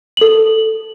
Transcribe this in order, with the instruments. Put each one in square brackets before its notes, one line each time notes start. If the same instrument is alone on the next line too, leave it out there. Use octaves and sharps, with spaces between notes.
[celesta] A4 F#7